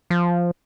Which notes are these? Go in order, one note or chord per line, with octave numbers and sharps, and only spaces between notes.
F3